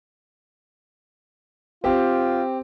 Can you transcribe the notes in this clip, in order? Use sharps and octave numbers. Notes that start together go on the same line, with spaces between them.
C4 F4 G4